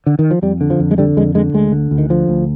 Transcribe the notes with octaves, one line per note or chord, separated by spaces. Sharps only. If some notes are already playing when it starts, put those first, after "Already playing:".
D3
D#3
F3
F2 G3
D3
F3
F2
G#3
D3 G3
F2 G#3
D3 G#3
D2 G#3
D3
D2
D#3
D3 F3
D2